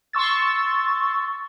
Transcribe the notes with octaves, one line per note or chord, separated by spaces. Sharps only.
C6 C#6 E6 A6